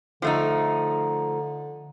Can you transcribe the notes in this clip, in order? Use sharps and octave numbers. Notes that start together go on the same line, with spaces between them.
D3 F3 A3 D#4